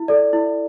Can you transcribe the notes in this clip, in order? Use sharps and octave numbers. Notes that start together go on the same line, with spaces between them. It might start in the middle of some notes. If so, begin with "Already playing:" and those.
Already playing: E4
A4 D5
E4